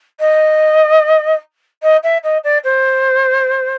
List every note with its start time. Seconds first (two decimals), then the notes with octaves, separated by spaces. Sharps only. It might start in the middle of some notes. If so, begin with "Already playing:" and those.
0.20 D#5
1.83 D#5
2.04 E5
2.24 D#5
2.44 D5
2.64 C5